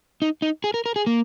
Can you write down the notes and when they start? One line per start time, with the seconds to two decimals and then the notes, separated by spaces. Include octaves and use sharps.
0.22 D#4
0.42 D#4
0.64 G#4
0.74 A#4
0.86 A#4
0.96 G#4
1.07 A#3